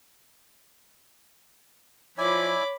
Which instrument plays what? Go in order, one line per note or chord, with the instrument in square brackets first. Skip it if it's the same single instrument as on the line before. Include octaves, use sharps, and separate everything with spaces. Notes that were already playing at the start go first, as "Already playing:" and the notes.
[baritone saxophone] F3 [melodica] E4 D5 G#5 [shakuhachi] C#5 [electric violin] B5 D6